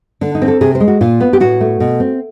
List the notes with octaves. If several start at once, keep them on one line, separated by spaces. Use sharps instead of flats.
D3 D4
D#4
C4
A4
C3 G#4
C5
G#3
F#4
A#2 F4
B3
G4
A2 F#4
A3
B2
C4